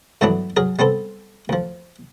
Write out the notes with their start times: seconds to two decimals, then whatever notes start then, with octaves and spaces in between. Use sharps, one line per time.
0.21 G2 D3 E3 F#3 B3 D4
0.57 F#3 G#4 A#4
0.79 G3 B3 C4 A4
1.49 D2 F3